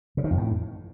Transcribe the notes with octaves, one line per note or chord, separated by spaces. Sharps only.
C#3
D#3
F2
A2